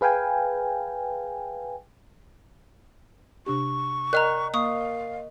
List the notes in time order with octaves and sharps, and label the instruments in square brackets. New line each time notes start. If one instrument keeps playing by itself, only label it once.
[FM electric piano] G#4 B4 F5 G5 G#5
[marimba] C3 D4 G4 [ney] C#6
[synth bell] A#4 D#5 [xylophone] A#5 F6 F#6
[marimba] A#3 [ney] F5 [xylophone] C#6 D#6